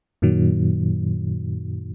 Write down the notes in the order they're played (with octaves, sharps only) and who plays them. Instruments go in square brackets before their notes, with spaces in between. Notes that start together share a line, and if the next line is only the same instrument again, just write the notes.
[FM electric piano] F#2 A#2 D#3 F#3